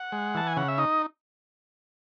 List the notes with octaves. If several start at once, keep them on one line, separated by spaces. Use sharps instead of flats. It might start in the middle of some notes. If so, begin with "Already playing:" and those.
Already playing: F#5
G#3
E3 A5
G#5
C#3 F#5
E5
D#4 D#5